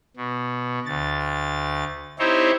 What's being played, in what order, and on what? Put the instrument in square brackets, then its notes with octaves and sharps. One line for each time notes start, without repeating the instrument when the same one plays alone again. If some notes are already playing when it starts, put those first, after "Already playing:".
[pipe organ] B2
D2 A6
C4 D#4 E4 G4 C5 C#5